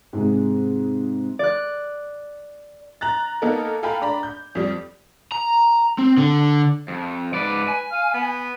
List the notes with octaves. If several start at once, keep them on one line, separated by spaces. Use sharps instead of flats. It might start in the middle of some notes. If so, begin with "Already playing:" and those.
G#2 C3 G#3
D5 F#6
A#5 F#6 A6
A#3 B3 D#4 A4 A#4
A4 F5 G5 G#5 A#5 B5
D4 D5 A#5 B5
G6
F2 G3
A#5
C4
D3
F2
G#2 B4 D5
G#5
F5
B3